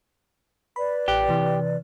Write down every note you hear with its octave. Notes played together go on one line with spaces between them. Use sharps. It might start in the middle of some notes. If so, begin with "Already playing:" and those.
B4 D5 B5
A1 G4 G5 F#6
C3 E3